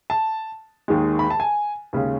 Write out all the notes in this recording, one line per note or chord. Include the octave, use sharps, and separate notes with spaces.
A5
D#2 D#3 G#3
B5
A5
G#5
D#2 C#3 G#3